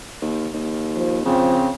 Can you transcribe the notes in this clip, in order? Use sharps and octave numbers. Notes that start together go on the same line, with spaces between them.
D#2
D#2
F3
C#3 F3 C4